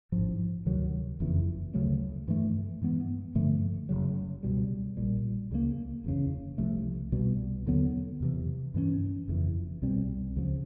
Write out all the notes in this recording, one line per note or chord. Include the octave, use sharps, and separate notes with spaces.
A1 G#2 F3
D2 C3 D#3 F#3
F#1 F2 C#3 E3
D2 C#3 F#3 A3
G2 E3 A3
G2 E3 G#3 B3
G2 D3 F3 A3
F#1 F2 C#3 F#3
C#2 B2 G3
A#1 A#2 G3
C#2 C#3 F#3 A#3
F#1 E2 C#3
C2 C3 F3 A3
C2 B2 G3
D#2 D3 F#3 B3
E2 C3 E3
G2 E3 G#3 C#4
F#1 F2 C#3 E3
C2 B2 G3 C4
C#2 C#3 F3